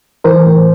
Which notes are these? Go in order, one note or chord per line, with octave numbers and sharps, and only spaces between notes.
E3 A#4 C5
A2